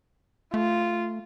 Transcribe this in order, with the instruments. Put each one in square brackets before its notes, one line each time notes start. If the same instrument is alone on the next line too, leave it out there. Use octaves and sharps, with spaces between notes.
[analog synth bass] A3 [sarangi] F4